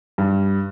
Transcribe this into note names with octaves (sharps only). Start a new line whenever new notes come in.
G2